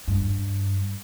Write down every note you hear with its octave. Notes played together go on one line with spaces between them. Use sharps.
G2